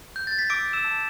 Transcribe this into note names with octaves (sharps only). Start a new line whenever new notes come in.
G6
A6
B6
D6 E6 D7
G6
E6 E7
A5